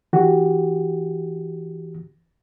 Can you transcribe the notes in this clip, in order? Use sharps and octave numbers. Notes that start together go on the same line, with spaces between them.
E3 F#4 G4